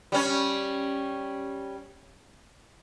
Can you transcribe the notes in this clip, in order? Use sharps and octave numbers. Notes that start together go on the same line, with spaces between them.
G3 C#4